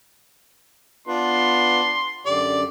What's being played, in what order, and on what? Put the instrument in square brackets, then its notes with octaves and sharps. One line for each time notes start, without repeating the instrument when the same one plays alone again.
[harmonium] B3 F4 B4 [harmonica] D4 [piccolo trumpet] C6
[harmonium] F#2 D3 G4 [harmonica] D5